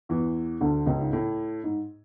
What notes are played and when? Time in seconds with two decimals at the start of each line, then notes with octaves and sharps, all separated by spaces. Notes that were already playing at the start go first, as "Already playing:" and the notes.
0.09 E2 E3
0.61 D2 D3
0.86 C#2 C#3
1.00 G#2
1.13 A2
1.64 G#2